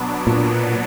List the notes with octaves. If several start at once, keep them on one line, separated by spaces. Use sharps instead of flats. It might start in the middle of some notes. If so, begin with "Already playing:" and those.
Already playing: B2 F#3 B3 D4
A#2